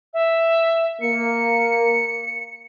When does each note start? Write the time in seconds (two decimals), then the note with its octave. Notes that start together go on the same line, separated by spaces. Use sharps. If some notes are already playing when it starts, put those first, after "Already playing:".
0.14 E5
1.01 A#3 C#7